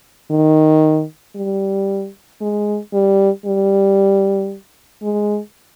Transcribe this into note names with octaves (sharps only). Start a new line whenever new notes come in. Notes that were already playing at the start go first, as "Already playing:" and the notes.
D#3
G3
G#3
G3
G3
G#3